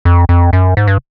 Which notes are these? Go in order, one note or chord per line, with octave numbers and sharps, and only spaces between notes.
F2
F2
F#2
G#2
G2